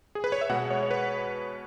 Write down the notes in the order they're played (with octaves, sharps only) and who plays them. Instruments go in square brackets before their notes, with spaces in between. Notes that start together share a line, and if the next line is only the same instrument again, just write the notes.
[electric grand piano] G#4
B4
C#5
E5
B2 G#3 B3 F#5
C#5
C#5
B4